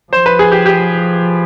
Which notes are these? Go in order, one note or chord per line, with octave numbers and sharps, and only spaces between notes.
F3 C5
B4
G#4
G4
G4